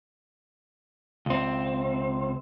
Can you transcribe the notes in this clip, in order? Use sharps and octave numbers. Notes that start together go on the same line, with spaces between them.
C#2 C4